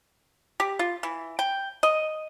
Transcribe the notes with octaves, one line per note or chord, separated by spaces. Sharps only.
G4
F4
E3
G5
D#5